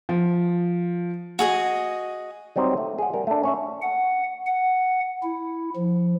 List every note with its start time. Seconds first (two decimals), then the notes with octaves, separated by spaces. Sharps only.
0.09 F3
1.39 F#4 G#4 D#5
2.56 F#3 G3 C4 D#4 C5 D#5
2.77 A3
2.98 G#4 F#5
3.14 G3 A#4
3.27 A3 D4
3.43 C#4 C#5 E5
3.82 F#5
4.46 F#5
5.23 E4
5.76 F3